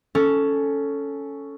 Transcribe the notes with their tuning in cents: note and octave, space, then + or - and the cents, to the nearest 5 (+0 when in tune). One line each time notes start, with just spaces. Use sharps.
C#4 +5 A4 +0